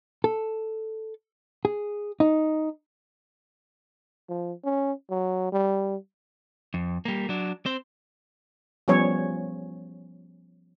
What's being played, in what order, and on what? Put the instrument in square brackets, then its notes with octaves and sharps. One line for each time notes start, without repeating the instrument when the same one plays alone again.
[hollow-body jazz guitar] A4
G#4
D#4
[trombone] F3
C#4
F#3
G3
[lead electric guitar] F2
G3 A#3
F#3 D4
C4 C5
[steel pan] F3 G3 B3 C#4 C#5